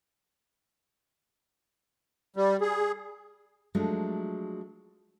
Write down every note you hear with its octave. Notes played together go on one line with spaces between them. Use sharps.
G3
G#4
F3 F#3 G#3 A3 D4